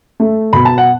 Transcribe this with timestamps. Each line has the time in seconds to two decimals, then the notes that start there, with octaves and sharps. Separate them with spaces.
0.20 A3
0.53 B2 B5
0.65 A5
0.78 F#5